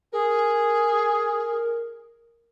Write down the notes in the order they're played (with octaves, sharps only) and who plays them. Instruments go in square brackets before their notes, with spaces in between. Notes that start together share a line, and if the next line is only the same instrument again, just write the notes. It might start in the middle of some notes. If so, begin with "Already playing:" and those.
[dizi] G#4 [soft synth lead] A#4